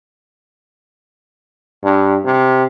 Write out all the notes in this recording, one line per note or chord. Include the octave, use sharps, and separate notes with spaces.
G2
C3